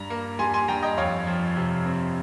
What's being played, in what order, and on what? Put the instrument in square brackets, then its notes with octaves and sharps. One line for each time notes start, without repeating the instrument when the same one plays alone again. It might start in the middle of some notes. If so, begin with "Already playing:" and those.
Already playing: [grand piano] G2 A#5
A#3
G3 G#5 C6
G#5 C6
G2 G5 A#5
D#5 G5
F2 C#5 F5
F3
C3
C4